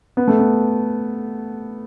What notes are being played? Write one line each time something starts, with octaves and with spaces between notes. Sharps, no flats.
B3
A3
B3